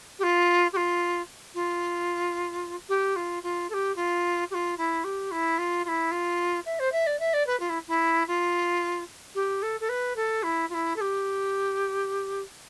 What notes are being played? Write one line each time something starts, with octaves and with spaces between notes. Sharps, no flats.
G4
F4
G4
F4
F4
G4
F4
F4
A4
G4
F4
G4
F4
E4
G4
E4
F4
F4
E4
F4
E5
C5
E5
D5
E5
D5
B4
F4
E4
E4
F4
G4
A4
A4
B4
A4
E4
F4
E4
A4
G4